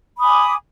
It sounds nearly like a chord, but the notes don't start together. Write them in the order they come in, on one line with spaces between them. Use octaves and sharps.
B5 D#6 G#5 D6